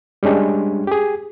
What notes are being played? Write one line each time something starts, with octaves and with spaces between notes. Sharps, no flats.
G3 G#3 C#4 D4 G4
G4 G#4